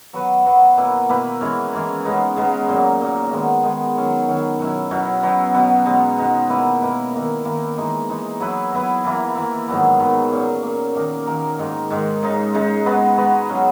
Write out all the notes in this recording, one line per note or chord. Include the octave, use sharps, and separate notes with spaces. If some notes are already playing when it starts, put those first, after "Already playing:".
F#3 B3 F#4 B4
F#3 B3 F#4 B4
B2 A#3 E4 B4
B2 A#3 E4 B4
E3 G#3 C#4
E3 G#3 C#4
C#3 G#3 B3 D#4
C#3 G#3 B3 D#4
A#2 F#3 A#3
A#2 F#3 A#3
D#3 G#3 B3
D#3 G#3 B3
D#3 F#3 C#4
D#3 F#3 C#4
B2 F#3 C#4 E4
B2 F#3 C#4 E4
B2 F#3 B3
B2 F#3 B3
B2 G#3 B3 D#4
B2 G#3 B3 D#4
B2 A#3 E4 B4
B2 A#3 E4 B4
D#3 A#3 E4
D#3 A#3 E4
E3 G#3 D#4
E3 G#3 D#4
F#3 B3 E4 B4
F#3 B3 E4 B4
E3 A#3 E4
E3 A#3 E4
G#2 D#3 F#3 B3
G#2 D#3 F#3 B3
A#2 A#3 C#4
A#2 A#3 C#4
D#3 A#3 D#4 A#4
D#3 A#3 D#4 A#4
G#2 D#3 G#3
G#2 D#3 G#3
C#3 G#3 D#4
C#3 G#3 D#4
G#3 B3 F#4 B4
G#3 B3 F#4 B4
C#3 F#3 C#4